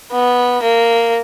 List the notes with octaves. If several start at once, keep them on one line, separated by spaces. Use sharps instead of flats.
B3
A#3